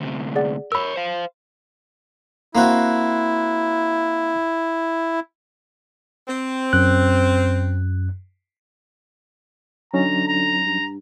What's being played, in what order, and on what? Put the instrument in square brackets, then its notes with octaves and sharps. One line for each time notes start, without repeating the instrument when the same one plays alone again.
[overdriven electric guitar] D2 C3
[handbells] G#4 D5 F#5
[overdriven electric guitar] A#4 C#5 [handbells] B5 E6
[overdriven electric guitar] C5 F5
[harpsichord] A#3 C4 F#4 [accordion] E4
[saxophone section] C4
[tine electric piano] F#2 F#6
[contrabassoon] D3 [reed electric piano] F#3 C#4 D#4 [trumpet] A#5
[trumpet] A#5
[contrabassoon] G2